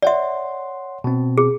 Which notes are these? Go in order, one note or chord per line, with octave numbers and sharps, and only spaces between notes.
C#5 D5 E5 F#5 C6
B2 C4
G#4